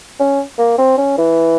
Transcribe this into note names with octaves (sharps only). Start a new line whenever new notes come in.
C#4
A#3
C4
C#4
E3